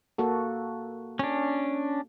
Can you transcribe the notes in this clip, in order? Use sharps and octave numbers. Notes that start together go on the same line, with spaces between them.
A#3 F#4 A4
C#4 D4